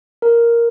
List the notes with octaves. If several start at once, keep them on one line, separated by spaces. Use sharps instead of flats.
A#4